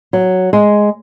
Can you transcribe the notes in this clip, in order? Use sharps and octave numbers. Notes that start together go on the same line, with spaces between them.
F#3
G#3